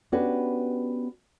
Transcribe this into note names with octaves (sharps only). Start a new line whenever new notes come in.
B3 C#4 D4 F#4 G4 B4